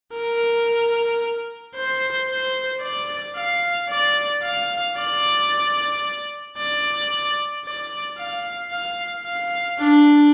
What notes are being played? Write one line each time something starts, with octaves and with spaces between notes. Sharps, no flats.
A#4
C5
C5
D5
F5
D5
F5
D5
D5
D5
F5
F5
F5
D4